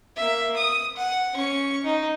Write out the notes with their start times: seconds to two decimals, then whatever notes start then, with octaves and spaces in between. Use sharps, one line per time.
0.16 A#3 E5
0.57 D#6
0.97 F#5
1.34 C#4 C#6
1.84 D#4